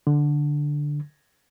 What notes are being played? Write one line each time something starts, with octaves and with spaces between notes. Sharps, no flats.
D3